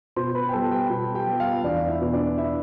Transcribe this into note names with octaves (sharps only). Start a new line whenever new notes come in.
B2 C5 C6
B4 B5
G5
G3 B3 F4 A4 A5
G4 G5
B2
G4 G5
G3 B3 F4
F4 F5
E2 D4 D5
E4 E5
B2 B3
D4 D5
E4 E5